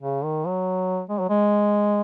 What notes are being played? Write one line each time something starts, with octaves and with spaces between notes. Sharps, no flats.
C#3
D#3
F#3
G#3
F#3
G#3